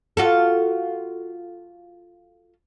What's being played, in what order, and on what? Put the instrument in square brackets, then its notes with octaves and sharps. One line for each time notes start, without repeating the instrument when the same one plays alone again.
[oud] F4 F#4 A4